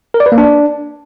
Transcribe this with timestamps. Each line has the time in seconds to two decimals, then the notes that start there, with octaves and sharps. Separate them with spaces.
0.14 A#4
0.20 D5
0.26 B4
0.32 A#3
0.38 D4